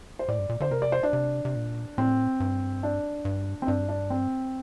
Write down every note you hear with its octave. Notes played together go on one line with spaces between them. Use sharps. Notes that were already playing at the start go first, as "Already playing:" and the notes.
C5
A2 D5
G2
A#2
D3 C5
C3 A#4
D5
C5
D4
C3
C3
A#2
A2 C4
G2
D4
G2
C4
G2 D4
D4
C4